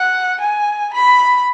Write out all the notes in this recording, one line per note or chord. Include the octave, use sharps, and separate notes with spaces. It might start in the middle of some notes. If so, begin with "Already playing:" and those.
Already playing: F#5
G#5
B5